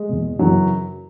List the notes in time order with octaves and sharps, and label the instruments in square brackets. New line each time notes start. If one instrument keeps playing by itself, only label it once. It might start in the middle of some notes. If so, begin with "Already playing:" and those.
Already playing: [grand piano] G#3
E2 B2
F#2 C#3 E3 F#3